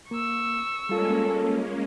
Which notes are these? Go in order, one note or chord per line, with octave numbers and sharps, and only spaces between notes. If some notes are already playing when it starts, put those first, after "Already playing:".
A#3 C#6 E6
G3 G#3 A#3 C#4 F4 A4